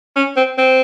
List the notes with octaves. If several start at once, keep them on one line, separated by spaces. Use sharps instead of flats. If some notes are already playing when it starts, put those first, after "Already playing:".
C#4
C4
C4